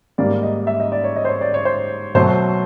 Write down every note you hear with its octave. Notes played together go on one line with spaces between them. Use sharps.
G#2 D#3 G3 A#3 D5
D#5
E5
D#5
D5
C#5
D#5
C5
C#5
D5
C#5
C5
B2 F#3 A3 C5